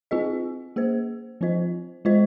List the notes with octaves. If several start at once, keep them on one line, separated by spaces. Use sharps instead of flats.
C4 F4 G#4 D#5
A#3 G#4 C5
F3 C4 F4 C5 D#5
G#3 F4 C5 D#5